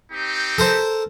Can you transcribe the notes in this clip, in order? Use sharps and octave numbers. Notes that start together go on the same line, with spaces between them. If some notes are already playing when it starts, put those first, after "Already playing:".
C4 D#4 G4
A4 A#4 C5